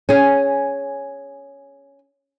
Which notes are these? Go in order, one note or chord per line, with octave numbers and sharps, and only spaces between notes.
C#4 G#4